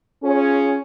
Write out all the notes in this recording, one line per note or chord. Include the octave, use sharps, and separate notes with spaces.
C#4 F4 G#4 C#5